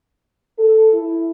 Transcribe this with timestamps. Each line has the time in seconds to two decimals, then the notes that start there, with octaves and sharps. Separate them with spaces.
0.58 A4
0.93 E4